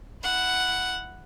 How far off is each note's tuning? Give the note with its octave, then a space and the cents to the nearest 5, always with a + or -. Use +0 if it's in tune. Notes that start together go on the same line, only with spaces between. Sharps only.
E4 +0 F#5 +0